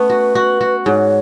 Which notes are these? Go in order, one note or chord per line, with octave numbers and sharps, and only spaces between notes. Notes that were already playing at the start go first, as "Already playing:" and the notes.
Already playing: A3 B3 C#4 B4
F#4
F#4
F#4
G#2 C#5